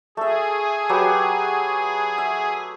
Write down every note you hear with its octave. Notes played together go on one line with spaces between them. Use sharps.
A3 G#4 E5
F#3 G4 B4
E5